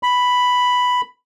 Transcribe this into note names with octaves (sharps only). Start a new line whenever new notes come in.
B5